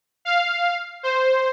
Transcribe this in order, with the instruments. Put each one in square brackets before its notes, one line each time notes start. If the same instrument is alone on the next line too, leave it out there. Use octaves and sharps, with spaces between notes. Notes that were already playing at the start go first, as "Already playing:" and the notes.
[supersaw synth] F5
C5